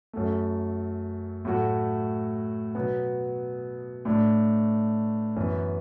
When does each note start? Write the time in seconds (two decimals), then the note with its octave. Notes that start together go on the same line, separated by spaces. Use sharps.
0.13 F#2 F#3 A3
1.45 A2 F#3 A3 F#4
2.75 B2 F#3 B3
4.05 A2 A3 D4
5.36 F#2 E3 B3